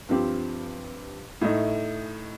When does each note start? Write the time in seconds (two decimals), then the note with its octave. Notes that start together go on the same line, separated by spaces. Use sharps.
0.09 G2 F3 C4 G4
1.41 A2 A3 D#4